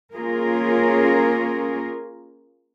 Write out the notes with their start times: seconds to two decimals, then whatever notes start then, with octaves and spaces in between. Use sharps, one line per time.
0.15 A#3 C#4 F4 G#4 A#4